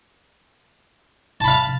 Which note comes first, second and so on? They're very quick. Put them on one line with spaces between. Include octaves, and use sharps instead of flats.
A5 B5 F5